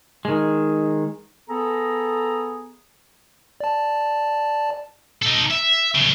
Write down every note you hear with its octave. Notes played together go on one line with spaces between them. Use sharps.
D#3 G#3
B3 G#4 A4 A#5
D5 A5
D#4 A4
E5
B1 C#3